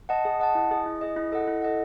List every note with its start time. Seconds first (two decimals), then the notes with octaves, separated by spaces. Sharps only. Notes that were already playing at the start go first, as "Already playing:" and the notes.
0.09 D#5 F#5 A5
0.25 G#4
0.40 D#5 F#5 A5
0.55 E4
0.71 G#4 D#5
0.86 E4
1.01 G#4 D#5
1.16 E4
1.32 A4 D#5 F#5
1.47 E4
1.62 A4 D#5 F#5